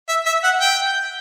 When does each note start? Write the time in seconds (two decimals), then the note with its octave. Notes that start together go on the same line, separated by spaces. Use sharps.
0.09 E5
0.26 E5
0.44 F#5
0.61 G5